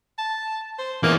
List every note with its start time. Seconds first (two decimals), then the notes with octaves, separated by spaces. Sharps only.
0.18 A5
0.79 C5
1.03 E3 A#3 B3 D#4